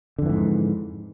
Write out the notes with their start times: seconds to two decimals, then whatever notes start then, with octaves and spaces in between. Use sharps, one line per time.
0.18 D3
0.22 F2
0.26 E3
0.29 G#2